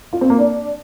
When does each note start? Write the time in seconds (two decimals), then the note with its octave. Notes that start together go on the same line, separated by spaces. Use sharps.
0.13 F4
0.21 C4
0.30 A#3
0.38 D4